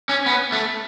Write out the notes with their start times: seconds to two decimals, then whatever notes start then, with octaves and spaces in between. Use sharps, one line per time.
0.09 C#4
0.26 B3
0.52 A3